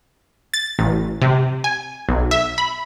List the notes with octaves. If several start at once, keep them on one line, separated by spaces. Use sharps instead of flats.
A6
A1
C3
G#5
B1
E5
B5